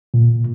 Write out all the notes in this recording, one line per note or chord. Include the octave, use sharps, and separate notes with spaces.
A#2